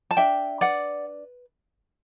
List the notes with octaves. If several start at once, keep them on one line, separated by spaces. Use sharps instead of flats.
A5
D4 E5 G5
B4 D5 F#5